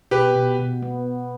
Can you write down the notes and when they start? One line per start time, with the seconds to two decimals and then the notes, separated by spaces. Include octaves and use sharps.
0.11 B2 G4 B4
0.36 B2
0.59 B2
0.83 B3